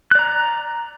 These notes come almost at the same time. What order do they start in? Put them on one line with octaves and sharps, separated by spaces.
F#6 D5 A#5